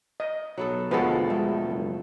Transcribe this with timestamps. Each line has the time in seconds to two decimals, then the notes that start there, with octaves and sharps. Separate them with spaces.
0.20 D#5
0.58 B1 F#3 B3 A4
0.91 E1 D2 B2 F3 G#3 F#4 A4 B4
1.30 G#3 A3
1.68 F#1